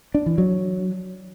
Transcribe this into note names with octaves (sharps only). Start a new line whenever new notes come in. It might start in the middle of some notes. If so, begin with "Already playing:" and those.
D4
E3
F#3